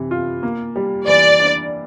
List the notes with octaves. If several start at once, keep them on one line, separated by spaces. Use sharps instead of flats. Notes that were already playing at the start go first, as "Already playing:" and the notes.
Already playing: C3 E3
F4
A#3
G3
E3 D5
D4